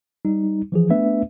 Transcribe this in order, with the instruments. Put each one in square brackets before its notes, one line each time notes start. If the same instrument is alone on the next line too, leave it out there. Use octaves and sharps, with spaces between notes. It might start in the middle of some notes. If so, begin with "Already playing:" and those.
[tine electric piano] G3 D#4
E3 F3 G#4
A3 B3 D4 B4 E5